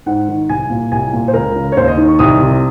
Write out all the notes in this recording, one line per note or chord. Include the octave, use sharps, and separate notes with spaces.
G#2 F#5
D#3
C2 G#5
A#2
C2 G#5
A#2
C5
C#2 A#4
C#3
C#5
D#2 C5
D#5
D#3
C#6
C2 D#6
C3